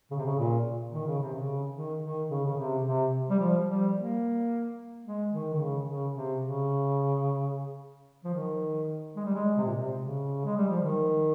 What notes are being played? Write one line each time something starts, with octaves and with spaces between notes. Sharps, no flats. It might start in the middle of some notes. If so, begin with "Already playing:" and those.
C#3
C3
C#3
A#2
D#3
C#3
C3
C#3
D#3
D#3
C#3
C#3
C3
C3
G3
F3
G3
A#3
G#3
D#3
D#3
C#3
C#3
C3
C#3
F3
D#3
G#3
G3
G#3
C3
A#2
C3
C#3
G#3
G3
F3
D#3